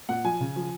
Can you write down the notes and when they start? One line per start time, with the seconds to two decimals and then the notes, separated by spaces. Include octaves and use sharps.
0.09 A#2 F#5
0.24 F3 G#5
0.40 C#3
0.56 F3